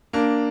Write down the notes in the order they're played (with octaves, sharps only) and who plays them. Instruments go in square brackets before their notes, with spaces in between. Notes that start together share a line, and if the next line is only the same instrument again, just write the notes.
[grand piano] A#3 D4